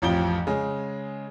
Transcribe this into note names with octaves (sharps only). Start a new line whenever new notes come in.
A1 F2 F3 G5 G7
C#3 G#3